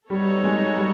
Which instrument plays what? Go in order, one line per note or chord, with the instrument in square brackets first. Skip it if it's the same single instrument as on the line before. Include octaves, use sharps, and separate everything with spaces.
[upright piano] G3 [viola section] B3 D#4 F#4 A4 C#5
[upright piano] G#3
G3